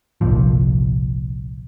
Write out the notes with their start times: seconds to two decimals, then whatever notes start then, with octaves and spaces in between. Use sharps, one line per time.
0.21 G1 C2 A#2 F3